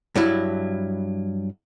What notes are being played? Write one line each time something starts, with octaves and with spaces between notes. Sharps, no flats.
G2 F#3 E4